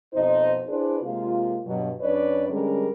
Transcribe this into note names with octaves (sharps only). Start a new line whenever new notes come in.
F2 B2 D#4 C5
D4 E4 G#4 B4 C5 D5
C3 G#3 A#3 F4
G2 B2 F#3
F#2 D4 B4 C#5 D5
D3 G3 G#3 C#4 G#4 A#4